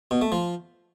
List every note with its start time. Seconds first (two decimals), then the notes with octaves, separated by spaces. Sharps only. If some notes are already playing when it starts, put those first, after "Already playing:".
0.11 B2
0.21 A3
0.32 F3